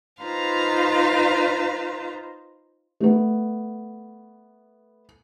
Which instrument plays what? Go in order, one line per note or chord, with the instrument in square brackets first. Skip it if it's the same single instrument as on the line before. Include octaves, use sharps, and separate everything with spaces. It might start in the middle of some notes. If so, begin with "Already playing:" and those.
[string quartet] D#4 F4 B4 C5 F5 A#5
[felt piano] A3 B3